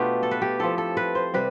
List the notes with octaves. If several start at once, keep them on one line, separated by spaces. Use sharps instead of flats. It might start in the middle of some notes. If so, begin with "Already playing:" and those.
Already playing: B2 A3 D4 F4 G4 B4
A4
B4
G4
F3 C4 E4 A4
A4
B4
C5
C3 G3 B4